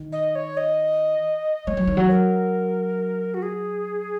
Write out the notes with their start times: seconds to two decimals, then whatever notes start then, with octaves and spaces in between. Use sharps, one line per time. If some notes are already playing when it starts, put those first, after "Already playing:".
Already playing: D#3
0.12 D#5
0.35 C#5
0.57 D#5
1.67 G#3 C#5
1.77 F#3
1.87 D#3
1.97 F#3
2.10 A#4
3.34 F#4
3.42 G#4